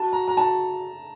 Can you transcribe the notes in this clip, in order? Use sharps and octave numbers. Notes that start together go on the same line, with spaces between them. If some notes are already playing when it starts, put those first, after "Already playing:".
Already playing: F#4 A5
A#5
A#5
A5